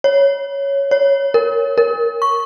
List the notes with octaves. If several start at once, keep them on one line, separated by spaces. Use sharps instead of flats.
C#5
C#5
A#4
A#4
C#6